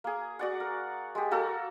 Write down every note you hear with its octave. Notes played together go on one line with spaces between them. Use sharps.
A#3 G#4
F#4 D5 F#5
A#4
G#3 G4
A#3 F#4 A4 A#4